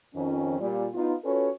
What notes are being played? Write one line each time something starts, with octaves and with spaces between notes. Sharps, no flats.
F2 D#3 F3 C#4
A#2 G3
B3 D#4 F4
C#4 F4 F#4 A4 B4 C#5